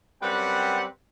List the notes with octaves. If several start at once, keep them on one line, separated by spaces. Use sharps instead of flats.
F#2 G3 C4 B4 F#5